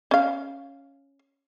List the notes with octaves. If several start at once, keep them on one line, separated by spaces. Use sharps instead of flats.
C#4 F5